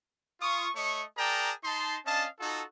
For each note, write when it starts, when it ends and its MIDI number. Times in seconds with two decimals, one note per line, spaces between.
0.41 0.69 65
0.41 0.69 85
0.41 0.69 87
0.76 1.03 57
0.76 1.03 73
0.76 1.03 75
0.76 1.03 85
1.17 1.52 68
1.17 1.52 70
1.17 1.52 74
1.17 1.52 79
1.17 1.52 81
1.17 1.52 82
1.64 1.98 63
1.64 1.98 81
1.64 1.98 84
2.05 2.26 61
2.05 2.26 62
2.05 2.26 75
2.05 2.26 77
2.05 2.26 81
2.39 2.63 63
2.39 2.63 65
2.39 2.63 66
2.39 2.63 69